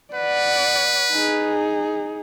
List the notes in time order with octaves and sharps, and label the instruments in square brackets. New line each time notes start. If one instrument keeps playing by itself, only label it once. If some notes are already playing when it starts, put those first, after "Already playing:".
[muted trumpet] B4 [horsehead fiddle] D5 F#5
[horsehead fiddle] D#4 G#4